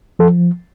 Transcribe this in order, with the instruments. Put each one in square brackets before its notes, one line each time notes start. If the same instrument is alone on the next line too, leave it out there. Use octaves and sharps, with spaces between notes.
[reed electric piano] F3 A4